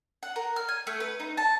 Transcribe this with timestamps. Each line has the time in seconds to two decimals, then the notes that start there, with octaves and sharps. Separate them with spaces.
0.23 F#5
0.36 A#4
0.56 F6
0.69 G#5
0.87 A3
1.00 B4
1.20 D#4
1.37 A5